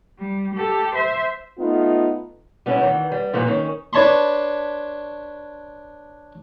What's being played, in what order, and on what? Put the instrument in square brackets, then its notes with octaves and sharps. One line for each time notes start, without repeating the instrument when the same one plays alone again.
[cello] G3
G4 A4
C5 E5
[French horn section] A3 B3 D#4 F4
[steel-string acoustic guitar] G3 B3 C#4 E4
D#3 E3
G3
G2 A#2 E3 F3
D#3 C#4
[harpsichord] D4 B4 C#5 A5 B5 C6